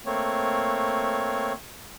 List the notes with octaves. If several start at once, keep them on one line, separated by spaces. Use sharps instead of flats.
A3 A#3 C4 C#5